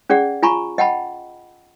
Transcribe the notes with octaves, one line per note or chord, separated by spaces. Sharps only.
C#4 G#4 D5 F#5
F4 G#5 A#5 B5 C#6
D#5 F#5 G5 A5 B5